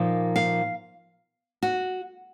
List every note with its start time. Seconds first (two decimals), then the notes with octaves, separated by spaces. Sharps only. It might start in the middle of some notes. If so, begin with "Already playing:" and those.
Already playing: A#2 F3 A#3 D#4
0.36 F5
1.63 F#4